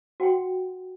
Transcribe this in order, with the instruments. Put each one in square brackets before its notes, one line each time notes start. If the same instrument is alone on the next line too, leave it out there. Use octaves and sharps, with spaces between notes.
[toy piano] F#4 F#5 G5 C6